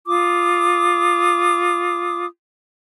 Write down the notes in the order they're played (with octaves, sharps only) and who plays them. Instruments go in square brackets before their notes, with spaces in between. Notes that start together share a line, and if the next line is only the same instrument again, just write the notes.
[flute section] F4 D6 D#6